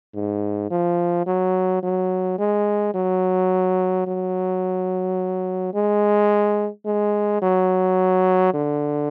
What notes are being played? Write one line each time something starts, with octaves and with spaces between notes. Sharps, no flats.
G#2
F3
F#3
F#3
G#3
F#3
F#3
G#3
G#3
F#3
D3